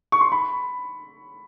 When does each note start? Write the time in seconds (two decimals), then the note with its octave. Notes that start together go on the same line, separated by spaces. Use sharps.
0.12 C#6
0.21 C6
0.32 B5